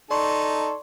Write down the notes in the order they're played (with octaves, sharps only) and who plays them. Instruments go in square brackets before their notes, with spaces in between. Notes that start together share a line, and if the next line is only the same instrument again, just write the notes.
[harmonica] D#4 A4 [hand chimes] D5 C6 C#6